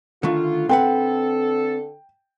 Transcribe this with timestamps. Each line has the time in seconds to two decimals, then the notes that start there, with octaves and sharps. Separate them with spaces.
0.23 D3 D#3 A3 F4
0.69 D3 C4 A4 B4 F#5 G5